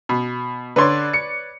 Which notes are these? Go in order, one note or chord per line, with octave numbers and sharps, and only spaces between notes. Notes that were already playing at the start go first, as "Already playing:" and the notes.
B2
D3 B4 C#5 D5 C6
C#7